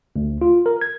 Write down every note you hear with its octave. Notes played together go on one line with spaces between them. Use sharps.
D2
F4
A#4
G#6